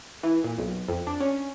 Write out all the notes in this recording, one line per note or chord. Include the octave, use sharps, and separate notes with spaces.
E3
A#2
B1
F2
D4
C#4